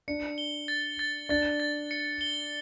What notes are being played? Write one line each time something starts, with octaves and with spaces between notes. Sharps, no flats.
D4 C#7
G7
A6
A6
D4 A6
A6
C#7
G7